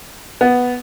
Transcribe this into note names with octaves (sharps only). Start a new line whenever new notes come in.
B3